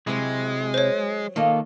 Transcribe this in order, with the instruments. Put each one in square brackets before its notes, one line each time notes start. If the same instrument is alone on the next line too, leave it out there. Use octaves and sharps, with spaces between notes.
[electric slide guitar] C3 E4 [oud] F#3 C4 [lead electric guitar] G#3
[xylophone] C5 C#5
[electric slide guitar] D#3 A4 [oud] A#3 F4 D#5